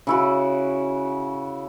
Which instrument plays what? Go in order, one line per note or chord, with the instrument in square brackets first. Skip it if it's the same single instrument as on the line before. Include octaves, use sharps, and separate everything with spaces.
[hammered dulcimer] C#3 E4 F#4